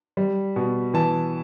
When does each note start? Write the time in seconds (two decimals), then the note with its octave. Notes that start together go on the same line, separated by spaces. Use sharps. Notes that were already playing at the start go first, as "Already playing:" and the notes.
0.17 G3
0.56 B2
0.94 E3 A5